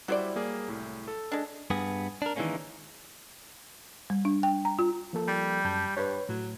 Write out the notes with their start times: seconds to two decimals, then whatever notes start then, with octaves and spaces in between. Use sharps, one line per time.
0.08 F#3 G3 E4 C5 D5
0.35 G3 A#3 G#4
0.68 C2 A2
1.08 A4
1.32 G#3 D4
1.70 G2 B3 G#4
2.22 D4 A#4
2.36 D#3 E3 F#3 G#3 A#3 C#4
4.10 G3
4.25 D4
4.43 G5
4.65 A#5
4.79 F4
5.13 F3 A#3 A4
5.28 G3
5.65 F#2 A5 G6
5.97 G2 B4 C#5
6.29 A2 F#3